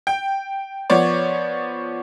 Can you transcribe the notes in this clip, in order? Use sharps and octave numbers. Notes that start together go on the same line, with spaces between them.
G5
F3 B3 C#5 D5